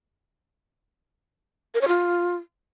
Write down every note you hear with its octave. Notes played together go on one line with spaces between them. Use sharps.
A#4
C#5
F4